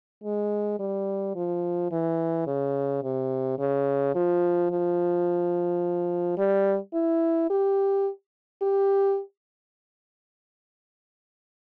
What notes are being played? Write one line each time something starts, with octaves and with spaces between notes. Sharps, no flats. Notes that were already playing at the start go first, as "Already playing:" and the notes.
G#3
G3
F3
E3
C#3
C3
C#3
F3
F3
G3
E4
G4
G4